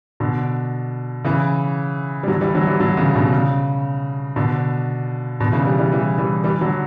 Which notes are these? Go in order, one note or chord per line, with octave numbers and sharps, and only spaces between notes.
B2 D3
C#3 E3
G3
D3 F#3
E3 G3
D3 F#3
E3 G3
D3 F#3
C#3 E3
B2 D3
C#3
B2 D3
B2 D3
C#3 E3
E3 G3
E3 G3
E3 G3
E3 G3
E3 G3
D3 F#3